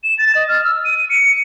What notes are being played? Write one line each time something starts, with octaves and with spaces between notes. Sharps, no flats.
E7
A6
D#5
F6
E6
D#7
C#7